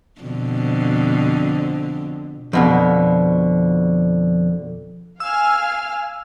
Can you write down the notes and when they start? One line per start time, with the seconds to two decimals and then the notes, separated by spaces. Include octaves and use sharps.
0.21 F2 B2 D3
2.53 F2 B2 D3
5.20 F5 G#5 E6 F6